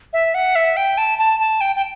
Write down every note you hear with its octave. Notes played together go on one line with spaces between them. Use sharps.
E5
F#5
E5
G5
A5
A5
A5
G5
G5